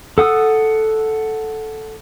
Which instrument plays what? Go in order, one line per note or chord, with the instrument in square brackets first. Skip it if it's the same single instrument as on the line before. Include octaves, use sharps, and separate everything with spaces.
[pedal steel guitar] A4 F#5 D#6 E6